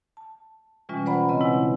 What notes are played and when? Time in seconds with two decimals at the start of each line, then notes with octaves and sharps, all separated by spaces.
0.17 A5
0.89 B2 E3 G3 G#3 C#4 F4
1.06 B4 C5 D5 F#5 A#5 B5
1.28 C#3 C4 D#5 A5
1.41 B2 G#3 E4 F#5